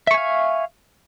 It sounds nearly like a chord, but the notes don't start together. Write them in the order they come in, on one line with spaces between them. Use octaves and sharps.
E5 C#6 G#5 F5